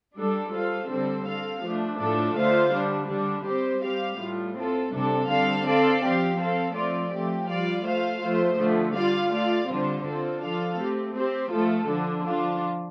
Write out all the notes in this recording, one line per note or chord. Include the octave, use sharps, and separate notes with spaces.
G3 D4 A4
G3 F4 A4 C5 F5
D3 G3 C4 A4 C5
C4 A4 F5
F3 A3 D4
A2 F3 A3 D4 A4
D3 A3 F4 C5 F5
D3 G3 D4
D3 G3 D4
G3 C4 G4 C5
G3 C4 G4 F5
A2 G3 F4
C4 F4 A4
C3 G3 D4 A4
D3 G3 C4 A4 F5
C4 A4 D5 F5
F3 C4 G4 F5
C4 A4 F5
F3 A3 C4 F4 D5
F3 A3 C4 G4
G3 F4 D5 F5
A3 F4 C5 F5
F3 A3 F4 C5
D3 F3 A3
G3 F4 D5 F5
A3 F4 D5 F5
D3 G3 C4 F4 C5
C4 F4 A4 C5
F3 D4 F4 A4 F5
A3 C4 G4
C4 G4 C5
F3 A3 F4 A4
D3 F3 D4
F3 D4 F4